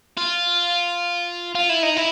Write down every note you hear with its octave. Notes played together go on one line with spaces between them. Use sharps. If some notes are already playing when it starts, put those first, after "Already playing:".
F4
F4
E4
D#4
E4